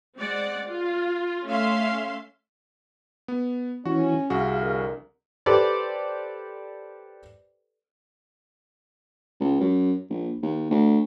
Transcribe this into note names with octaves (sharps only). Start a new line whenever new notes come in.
G#3 C4 D5 F#5
F4
A3 C#4 E5 F5 C6
B3
E3 C#4 F#4
C2 F#4 G#4 F5
F2 D3 A#4
G4 A4 B4 C5 D5
C#2
F#2
A#1
D#2
D2